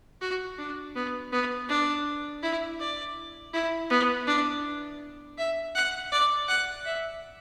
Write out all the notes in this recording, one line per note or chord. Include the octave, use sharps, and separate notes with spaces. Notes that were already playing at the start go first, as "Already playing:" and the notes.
F#4
D4
B3
B3
D4
E4
D5
E4
B3
D4
E5
F#5
D5
F#5
E5